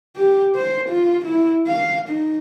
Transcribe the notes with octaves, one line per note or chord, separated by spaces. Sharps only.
G4
C5
F4
E4
F5
D#4